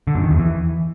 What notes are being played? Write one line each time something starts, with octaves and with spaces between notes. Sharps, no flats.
D3
F#2
D#3
E2
E3